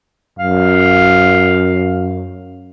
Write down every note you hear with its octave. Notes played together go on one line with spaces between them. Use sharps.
F#2 F5